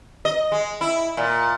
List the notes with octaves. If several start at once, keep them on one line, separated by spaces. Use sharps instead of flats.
D#5
G#3
E4
A#2